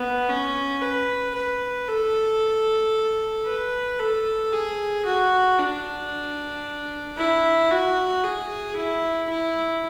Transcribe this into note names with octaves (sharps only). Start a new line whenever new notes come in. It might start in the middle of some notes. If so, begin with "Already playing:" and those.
Already playing: B3
C#4
B4
B4
A4
B4
A4
G#4
F#4
D4
E4
F#4
G#4
E4
E4